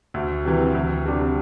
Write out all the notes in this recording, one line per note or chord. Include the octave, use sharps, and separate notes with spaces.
D2
C3 E3
D2
C3 G3 D4